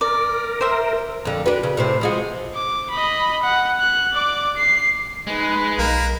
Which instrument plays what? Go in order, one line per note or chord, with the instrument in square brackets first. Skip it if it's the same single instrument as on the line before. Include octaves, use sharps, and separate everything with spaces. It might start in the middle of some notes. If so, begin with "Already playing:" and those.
[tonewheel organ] A#4 [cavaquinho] D5
[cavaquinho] C5 E5
[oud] F2 D3
D4 F#4 B4
C#3
A2 C3 C4
F3 G#3 F#4
[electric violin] D6
D#5 B5
F#5
F#6
D5 D6
C7
[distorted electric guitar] G#3 [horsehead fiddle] D#4 B4
[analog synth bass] B1 [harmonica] A#3